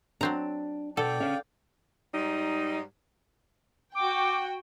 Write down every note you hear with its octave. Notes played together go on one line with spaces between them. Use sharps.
F#3 C4 D4 A#5
B2 A4 D5 F#5 G5 D6
C#4 G#4 C#5 F5
G#2 G3 D#4
F#4 G5 D6